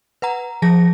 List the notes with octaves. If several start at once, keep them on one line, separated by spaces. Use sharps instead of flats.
B4 F#5 A#5
F3 G#4 A5 A#6